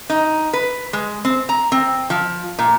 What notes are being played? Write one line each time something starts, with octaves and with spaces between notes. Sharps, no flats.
D#4
B4
G#3
C4
A#5
C4
F3
A#2